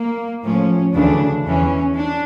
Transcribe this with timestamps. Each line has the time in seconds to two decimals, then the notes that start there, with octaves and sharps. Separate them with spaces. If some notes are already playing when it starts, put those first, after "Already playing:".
Already playing: A#3
0.44 A2 F3 C#4
0.94 D2 C#3 E3 D4
1.45 E2 E3 C#4
1.96 D4